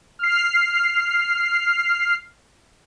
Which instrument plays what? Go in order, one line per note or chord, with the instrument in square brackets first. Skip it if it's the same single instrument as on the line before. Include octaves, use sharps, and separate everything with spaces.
[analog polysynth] F6 C7